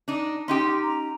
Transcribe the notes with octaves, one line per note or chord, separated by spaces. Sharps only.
D4 D#4
C#4 D#4 G4 C6
A#5